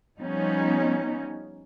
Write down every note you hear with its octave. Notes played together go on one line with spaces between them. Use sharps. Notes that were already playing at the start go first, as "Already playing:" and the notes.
F3 G3 B3 C#4 D#4